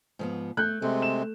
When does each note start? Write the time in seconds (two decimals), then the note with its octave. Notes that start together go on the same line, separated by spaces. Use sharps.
0.19 G#2 F3 B3
0.57 A3 F#6 G6
0.82 C3 G#3 A3 C4
1.02 E7